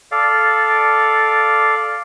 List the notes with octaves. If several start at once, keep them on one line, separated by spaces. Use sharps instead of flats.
A4 D5 F5